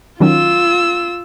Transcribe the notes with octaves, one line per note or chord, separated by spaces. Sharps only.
D#3 F#3 C#4 F4 E6